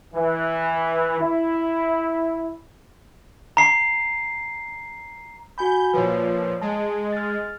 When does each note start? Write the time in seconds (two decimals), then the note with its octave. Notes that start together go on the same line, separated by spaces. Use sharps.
0.14 E3
1.20 E4
3.57 A#5 C7
5.58 F#4 G#5 B5 G6
5.93 A#2 F3 B4 C#5
6.62 G#3 A5
7.13 F6 A6